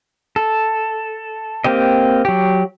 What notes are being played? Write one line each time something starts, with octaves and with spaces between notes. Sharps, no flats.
A4
A#3 C4 G4 D#5
F#3 G4